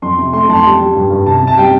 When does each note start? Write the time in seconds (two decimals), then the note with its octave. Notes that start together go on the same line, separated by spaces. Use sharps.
0.02 F2 C6
0.18 C3
0.33 A3 C6
0.48 F2 A5
0.55 C6
0.63 G3 A5
0.80 G3
0.95 G2
1.10 G2
1.26 C2 A5
1.42 C3
1.47 A5
1.57 G3 G5